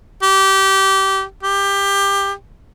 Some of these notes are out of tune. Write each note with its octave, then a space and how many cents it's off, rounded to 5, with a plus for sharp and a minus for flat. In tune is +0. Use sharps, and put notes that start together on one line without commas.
G4 -20
G4 +20